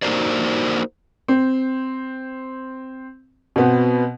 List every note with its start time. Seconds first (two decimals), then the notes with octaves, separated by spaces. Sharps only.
0.02 A#3 D#4 F#4 A#4 C5 D5
1.28 C4
3.56 B2 B3 C4